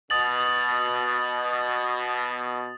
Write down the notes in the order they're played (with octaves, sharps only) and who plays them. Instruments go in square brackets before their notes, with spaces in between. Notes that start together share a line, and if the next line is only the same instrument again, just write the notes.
[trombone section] B2 [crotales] D#6 A6 F#7